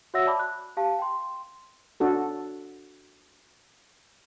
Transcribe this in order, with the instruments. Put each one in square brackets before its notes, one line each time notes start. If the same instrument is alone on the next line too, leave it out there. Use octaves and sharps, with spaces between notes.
[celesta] F#4 C#5 E5 F#5 E6 A#6
D5 A5 B5 D6
F#6
G4 F5 A5
G5 C6
[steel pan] D4 F#4 A4